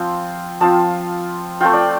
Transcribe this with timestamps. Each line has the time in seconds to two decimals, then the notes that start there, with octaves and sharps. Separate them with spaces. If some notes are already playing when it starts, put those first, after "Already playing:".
Already playing: F3 C4 F4 C6
0.61 F3 C4 F4 A5
1.61 A3 C4 F4 G5
1.73 D5